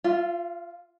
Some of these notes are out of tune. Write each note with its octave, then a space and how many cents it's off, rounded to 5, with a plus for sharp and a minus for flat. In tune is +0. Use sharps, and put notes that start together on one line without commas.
F4 +0 F5 -45